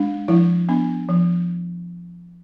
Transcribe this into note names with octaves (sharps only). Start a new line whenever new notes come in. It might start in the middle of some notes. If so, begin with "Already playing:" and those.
Already playing: G#3 D4
F3 E4
B3 D4
F3